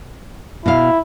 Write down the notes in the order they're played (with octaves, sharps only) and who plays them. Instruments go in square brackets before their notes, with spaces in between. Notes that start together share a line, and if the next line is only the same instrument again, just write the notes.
[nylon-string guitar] B2 F5 [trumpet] E4